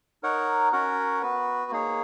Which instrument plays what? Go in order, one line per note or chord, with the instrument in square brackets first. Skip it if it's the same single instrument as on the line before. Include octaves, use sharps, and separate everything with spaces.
[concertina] D#4 A#4 C#5 F#5
C#4 F#4 A#4 C#5 F#5
B3 F#4 B4
A#3 D#4 G#4 C#5